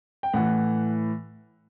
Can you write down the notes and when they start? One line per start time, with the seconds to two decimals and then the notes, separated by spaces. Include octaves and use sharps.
0.23 G5
0.33 A2 E3 F#5